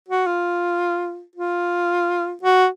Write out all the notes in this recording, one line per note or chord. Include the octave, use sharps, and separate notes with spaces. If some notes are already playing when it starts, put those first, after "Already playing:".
F#4
F4
F4
F#4